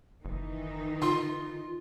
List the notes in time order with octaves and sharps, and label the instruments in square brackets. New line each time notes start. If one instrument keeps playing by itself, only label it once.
[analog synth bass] F#1 [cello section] D#3 E3 D#4
[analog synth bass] D3 [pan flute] F4 [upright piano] C6